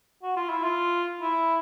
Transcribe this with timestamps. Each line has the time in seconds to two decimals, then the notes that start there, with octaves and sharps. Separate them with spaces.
0.23 F#4
0.37 F4
0.50 E4
0.64 F4
1.21 E4